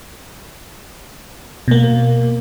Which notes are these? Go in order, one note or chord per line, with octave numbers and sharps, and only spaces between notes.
B2 A#3